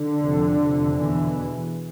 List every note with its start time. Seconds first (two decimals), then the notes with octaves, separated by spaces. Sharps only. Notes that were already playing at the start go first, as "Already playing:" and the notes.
Already playing: D3
0.19 F2 C3
0.59 F2 C3
0.98 E2 B2 E3